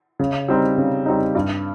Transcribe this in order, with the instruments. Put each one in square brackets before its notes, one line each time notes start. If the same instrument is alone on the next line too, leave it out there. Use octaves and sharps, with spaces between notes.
[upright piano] C#3
G3 C4 D#4
C#3
G3 C4 D#4
G2